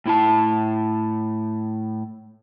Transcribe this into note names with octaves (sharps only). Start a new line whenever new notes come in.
A2 E4 A5